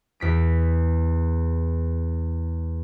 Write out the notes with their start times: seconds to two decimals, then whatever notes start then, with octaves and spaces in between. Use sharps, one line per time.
0.20 E2 B6 D7